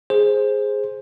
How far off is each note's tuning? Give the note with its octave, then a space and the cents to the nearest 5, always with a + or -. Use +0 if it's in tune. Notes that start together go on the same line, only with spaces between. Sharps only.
G#4 +0 C5 +10